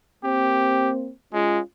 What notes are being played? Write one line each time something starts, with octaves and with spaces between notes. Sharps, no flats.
A#3 C4 G4
G#3 C#4 F4